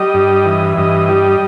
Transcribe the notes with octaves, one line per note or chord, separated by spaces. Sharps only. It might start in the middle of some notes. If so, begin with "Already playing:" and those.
Already playing: G3 D#5
G2
E3
G2 D#5
G3